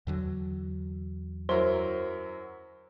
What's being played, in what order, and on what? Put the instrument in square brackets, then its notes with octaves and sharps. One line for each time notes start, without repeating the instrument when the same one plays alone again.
[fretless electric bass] E2 D3 F#3
[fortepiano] F#2 E4 A#4 [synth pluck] C5